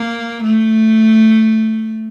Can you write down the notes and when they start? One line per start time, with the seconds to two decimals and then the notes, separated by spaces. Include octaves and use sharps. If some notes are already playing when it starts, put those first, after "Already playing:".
Already playing: A#3
0.43 A3